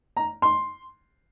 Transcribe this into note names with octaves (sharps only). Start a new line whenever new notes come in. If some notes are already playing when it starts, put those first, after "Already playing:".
A#5
C6